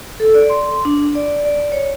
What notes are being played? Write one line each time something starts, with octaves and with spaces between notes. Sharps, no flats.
A4
D5
C6
D4
D5
D5
C#5